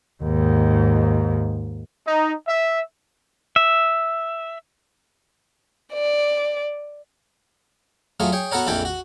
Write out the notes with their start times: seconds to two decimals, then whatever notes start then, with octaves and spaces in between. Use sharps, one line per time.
0.23 D#2 G#2
2.06 D#4
2.47 E5
3.56 E5
5.93 D5
8.20 F#3 A3 F4 G#4
8.32 G#4 C#5 G5
8.52 B3 F#4 A4 A#4 C#5
8.67 A#1 F2 E3 A4 G5 G#5
8.85 F#4